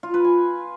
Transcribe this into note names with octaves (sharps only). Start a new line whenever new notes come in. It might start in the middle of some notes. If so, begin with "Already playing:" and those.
F4
B4
G#5